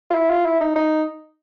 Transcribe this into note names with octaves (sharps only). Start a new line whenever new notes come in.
F4
E4
F4
E4
D#4
D#4